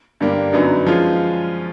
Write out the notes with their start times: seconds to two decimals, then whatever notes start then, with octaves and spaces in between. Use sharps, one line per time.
0.20 G2 D3 G3 A#3 D4
0.53 F#2 D3 F#3 B3 D#4
0.86 F3 G#3 C#4 F4